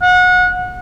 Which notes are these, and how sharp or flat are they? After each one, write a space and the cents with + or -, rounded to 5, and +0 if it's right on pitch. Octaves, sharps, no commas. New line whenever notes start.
F#5 -30